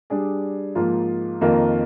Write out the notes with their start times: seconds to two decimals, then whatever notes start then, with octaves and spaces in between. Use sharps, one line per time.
0.10 G3 D4 G#4 D5
0.75 G#2 F3 A#3 F4
1.41 F2 D#3 A#3 F4 A#4